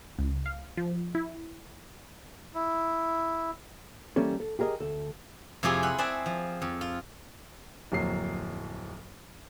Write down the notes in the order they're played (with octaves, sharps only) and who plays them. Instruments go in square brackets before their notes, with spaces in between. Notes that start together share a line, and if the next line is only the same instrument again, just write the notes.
[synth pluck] C#2
F5
F3
E4
[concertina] E4
[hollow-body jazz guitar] E3 G3 A#3 C#4 A4
A4
G4 G#4 A#4 D5 D#5
D2 A4
[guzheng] F2 C3 E4 F4 G4 G#4
F#5 G#5 B5
C4 G#4 D5 E5 F#5 A5
F3
F2
F4
[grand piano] D1 F2 F#3 A#3 C7